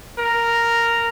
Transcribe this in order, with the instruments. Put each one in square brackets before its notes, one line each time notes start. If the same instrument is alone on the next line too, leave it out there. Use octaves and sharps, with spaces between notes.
[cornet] A#4